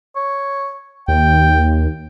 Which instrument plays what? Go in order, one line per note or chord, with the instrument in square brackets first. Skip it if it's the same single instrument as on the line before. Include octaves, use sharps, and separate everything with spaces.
[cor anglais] C#5
[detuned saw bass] D#2 [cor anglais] G5